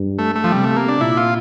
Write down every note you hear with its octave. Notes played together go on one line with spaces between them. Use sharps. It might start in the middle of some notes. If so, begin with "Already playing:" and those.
Already playing: G2
A3
A3
F3
C3 G3
A3
A#3
D4
A#2 E4
F4